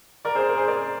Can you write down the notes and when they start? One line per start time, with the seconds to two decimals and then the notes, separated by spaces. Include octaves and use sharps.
0.25 A#4 D5
0.35 G#4 C5
0.49 A#4
0.57 G#4 C5
0.67 A#4 D5